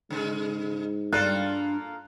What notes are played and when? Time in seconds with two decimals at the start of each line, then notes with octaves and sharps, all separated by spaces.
0.10 G#2 C#3 G#3
1.13 G2 A#3 F4 A4 D5 F#6